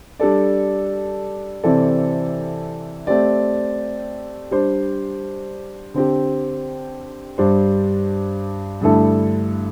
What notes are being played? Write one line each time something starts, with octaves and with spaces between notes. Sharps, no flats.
G3 D4 A4 D5
C3 E3 C4 A4 D5
A3 C4 G4 D5
G3 D4 C5
D3 C4 G4
G2 G3 D4 C5
G2 D3 A3 E4 A4